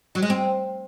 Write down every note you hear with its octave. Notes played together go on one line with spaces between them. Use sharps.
F#3
G#3
C4